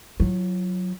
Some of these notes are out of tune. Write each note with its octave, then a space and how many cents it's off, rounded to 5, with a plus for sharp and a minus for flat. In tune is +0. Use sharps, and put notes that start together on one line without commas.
F#3 -15 F4 -35